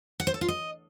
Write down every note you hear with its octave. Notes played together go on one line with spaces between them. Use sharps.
F#5
C5
A4
F4
D#5